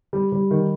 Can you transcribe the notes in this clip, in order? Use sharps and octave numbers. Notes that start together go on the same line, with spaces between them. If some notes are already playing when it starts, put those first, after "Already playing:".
G3
G3
D#3